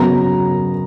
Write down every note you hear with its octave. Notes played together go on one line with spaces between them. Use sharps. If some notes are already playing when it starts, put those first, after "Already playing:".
Already playing: C#3 F#3 B3 A#5